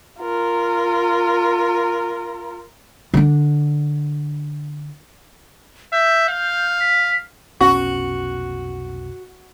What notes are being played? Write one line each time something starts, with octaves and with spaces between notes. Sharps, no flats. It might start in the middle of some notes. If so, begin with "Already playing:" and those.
F4 A#4
D3 D4
E5 G6
F5
B6
F1 B1 C#4 F#4